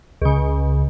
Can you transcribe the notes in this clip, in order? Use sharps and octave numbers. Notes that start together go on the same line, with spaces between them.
C#2 C#3